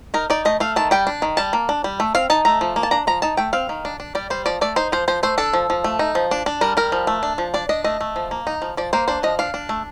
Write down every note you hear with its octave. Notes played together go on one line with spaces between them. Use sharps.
D#4 A#4
D#4 D5
A3 D#5
A3 F5
D#3 A5
G3 G5
D4
D#3
G3 A5
A#3
D4
G3
A3
C4 F5
D#4 A5
A3 A#5
F3
A#3
A5
D4 A#5
F3 A#5
D#4 A5
A3 G5
C4 F5
D#3
D4
D4
G3 D5
G3 C5
F3 D5
A3 D5
D#4 C5
F3 C5
F3 C5
A3 C5
D4 A4
F3
F3
A3
D#4
F3
D4
D4
G3 A#4
G3 A#4
F3
A3
D4
F3
D4 D5
D4 D#5
A3 D#5
A3
F3
A#3
D#4
F3
F3 D5
A#3 C5
D4 C5
F3 D#5
D4 F5
D4
A3